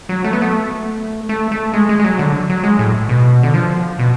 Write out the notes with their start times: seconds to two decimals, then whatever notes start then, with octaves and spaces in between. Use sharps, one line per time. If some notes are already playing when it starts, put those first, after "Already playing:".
0.09 F#3
0.24 A3
0.33 B3
0.42 A3
1.29 A3
1.52 A3
1.73 G#3
1.89 G#3
1.99 G#3
2.04 F#3
2.19 D3
2.49 F#3
2.63 G#3
2.79 A2
3.09 B2
3.43 D3
3.54 F3
3.99 B2